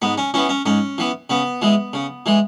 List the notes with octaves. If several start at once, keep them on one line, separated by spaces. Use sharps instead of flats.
G#2 B3
C#4
E3 B3 C#4
C#4
G#2 C#4
E3 B3
C#3 B3
E3 G#3
C#3
E3 G#3